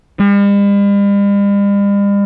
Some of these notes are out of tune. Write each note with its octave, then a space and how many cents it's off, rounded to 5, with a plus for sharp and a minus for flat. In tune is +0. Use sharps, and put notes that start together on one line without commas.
G3 +45